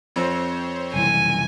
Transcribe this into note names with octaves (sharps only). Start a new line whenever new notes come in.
F2 C4 C5 C#5
F#1 C2 E3 G#5